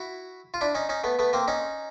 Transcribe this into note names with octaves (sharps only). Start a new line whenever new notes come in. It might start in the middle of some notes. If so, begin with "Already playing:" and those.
Already playing: E4 F#4
F4
D4 E4
C#4 D#4
C#4 D#4
A3 B3
A3 B3
A#3 C4
C#4 D#4